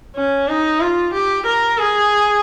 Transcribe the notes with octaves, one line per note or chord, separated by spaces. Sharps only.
C#4
D#4
F4
G4
A#4
G#4